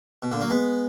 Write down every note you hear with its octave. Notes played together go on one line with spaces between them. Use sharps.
B2
A#2 D3
F#3 A#3
G#3 B3